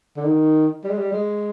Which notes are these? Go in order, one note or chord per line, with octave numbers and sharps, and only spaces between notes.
D3
D#3
G3
G#3
G3
G#3